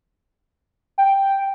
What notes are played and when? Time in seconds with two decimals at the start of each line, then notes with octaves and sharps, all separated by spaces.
0.98 G5